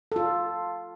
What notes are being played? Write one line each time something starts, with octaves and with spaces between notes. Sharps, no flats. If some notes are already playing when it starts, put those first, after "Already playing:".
F4 A4